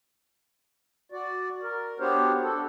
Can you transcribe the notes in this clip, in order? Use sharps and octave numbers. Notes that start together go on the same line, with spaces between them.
F#4 D5
A#4
B3 D4 F#4 G4 C5 C#5
D4 A4